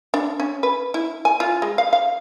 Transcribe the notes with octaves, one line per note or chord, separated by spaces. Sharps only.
D4
C#4
B4
E4
G#5
F4
G#3
F5
F5